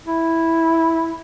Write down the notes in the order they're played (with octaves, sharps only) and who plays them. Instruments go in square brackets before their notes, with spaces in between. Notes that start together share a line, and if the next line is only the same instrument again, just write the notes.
[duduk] E4